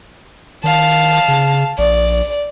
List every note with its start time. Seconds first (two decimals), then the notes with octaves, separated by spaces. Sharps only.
0.64 D#3 F5 A5
1.28 C#3
1.78 A#1 D5